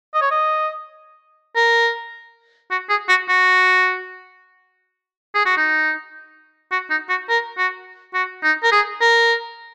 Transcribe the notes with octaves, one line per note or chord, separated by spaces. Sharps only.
D#5
C#5
D#5
A#4
F#4
G#4
F#4
F#4
G#4
F#4
D#4
F#4
D#4
F#4
A#4
F#4
F#4
D#4
A#4
G#4
A#4